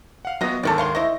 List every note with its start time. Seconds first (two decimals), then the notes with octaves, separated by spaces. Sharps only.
0.25 F5 F#5
0.41 F#3 B3 F4 D#5
0.63 D2 G#2 D#3 A4 C#5 D5
0.78 C#5 F5 C6
0.95 E4 C5 D#5 C#6 A#6